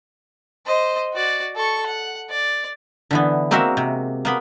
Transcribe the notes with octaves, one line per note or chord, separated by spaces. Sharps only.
C5 D#5
F#4 D5
A4 C#6
F#5
D5
D3 E3 B3
G#3 A#3 C4 F#4 A#4 E5
C3
A#3 B3 B5